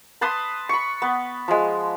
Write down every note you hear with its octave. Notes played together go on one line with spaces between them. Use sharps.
B4 A5 C6 D#6
B5 C#6
B3
F3 G#3